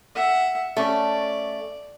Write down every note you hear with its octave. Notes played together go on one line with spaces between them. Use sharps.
E5 F#5
A3 C#4 D5